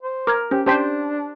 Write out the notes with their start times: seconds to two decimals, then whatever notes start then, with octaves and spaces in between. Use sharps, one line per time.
0.03 C5
0.27 A#4 D6 F6 G#6
0.51 C#4 G4 C5
0.66 C#4 D4 G4 C5 G5 A5 B6